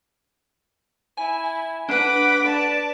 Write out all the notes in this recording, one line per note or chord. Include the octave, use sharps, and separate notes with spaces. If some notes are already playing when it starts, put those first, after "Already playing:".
E4 G#5
D4 B4 F#5 B5 D6 D7
D5 A5